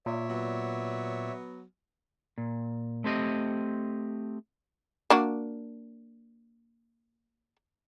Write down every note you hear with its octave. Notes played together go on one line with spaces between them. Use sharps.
A#2 C#5 D5 E5
F#3 B3
A#2
A3 C4 G4 D#5
A#3 D4 F#4